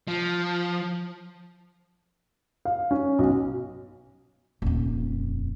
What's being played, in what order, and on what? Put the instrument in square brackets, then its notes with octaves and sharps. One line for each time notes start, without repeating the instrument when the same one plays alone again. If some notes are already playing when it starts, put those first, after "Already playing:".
[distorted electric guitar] F3
[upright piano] F5
C#4
B1
[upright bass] D#1 F2